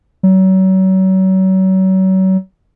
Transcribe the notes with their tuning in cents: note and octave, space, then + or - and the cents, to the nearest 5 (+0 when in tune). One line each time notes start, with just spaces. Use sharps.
F#3 +35